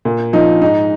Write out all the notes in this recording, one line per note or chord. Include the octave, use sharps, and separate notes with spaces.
A#2
F3 D#4
G#2 D#4